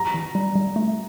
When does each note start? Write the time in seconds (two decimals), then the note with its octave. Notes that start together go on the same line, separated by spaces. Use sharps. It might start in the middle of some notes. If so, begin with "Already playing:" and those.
Already playing: A#5
0.14 E3
0.35 G3
0.55 G3
0.76 A3